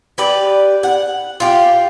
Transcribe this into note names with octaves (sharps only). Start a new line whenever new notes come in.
G4 B4 D5
F#5
F4 G4